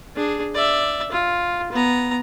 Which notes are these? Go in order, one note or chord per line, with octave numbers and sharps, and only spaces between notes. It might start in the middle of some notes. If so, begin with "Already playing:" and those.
D4 G#4
D5 E5
F4
B3 A#5